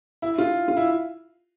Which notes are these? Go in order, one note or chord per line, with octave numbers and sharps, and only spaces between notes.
E4
F4
F4
E4